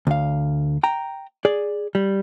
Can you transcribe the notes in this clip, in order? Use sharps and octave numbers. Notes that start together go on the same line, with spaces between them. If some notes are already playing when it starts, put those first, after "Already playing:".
D2 F5
G5 A#5
G#4 D5
G3